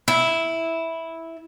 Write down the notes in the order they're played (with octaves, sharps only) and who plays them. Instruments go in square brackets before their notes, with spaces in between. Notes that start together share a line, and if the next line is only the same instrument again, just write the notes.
[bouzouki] E4